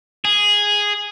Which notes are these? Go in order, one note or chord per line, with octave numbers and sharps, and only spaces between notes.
G#4